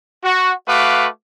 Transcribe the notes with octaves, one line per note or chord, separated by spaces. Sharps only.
F#4
A3 F#4 B4 F5 D6